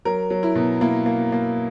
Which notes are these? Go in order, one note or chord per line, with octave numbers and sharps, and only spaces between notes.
F#3 A#4
F#3
E4
B2
A#3 E4
A#3
A#3